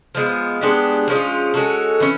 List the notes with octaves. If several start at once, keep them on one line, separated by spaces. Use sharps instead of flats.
F3 G#3 B3
G#3 B3 D4 G4
F3 G#3 C#4 F4
G#3 C#4 F#4 A4
E3 C#4